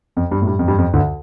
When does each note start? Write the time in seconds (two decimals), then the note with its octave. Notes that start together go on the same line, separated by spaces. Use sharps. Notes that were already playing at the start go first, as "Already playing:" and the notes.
0.17 F2
0.31 G2
0.42 A2
0.47 G2
0.59 F2
0.68 G2
0.78 F2
0.93 D2 D3